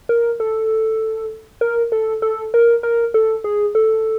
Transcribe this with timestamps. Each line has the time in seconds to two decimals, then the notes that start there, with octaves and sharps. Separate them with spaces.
0.09 A#4
0.40 A4
1.61 A#4
1.92 A4
2.22 A4
2.54 A#4
2.83 A#4
3.14 A4
3.44 G#4
3.75 A4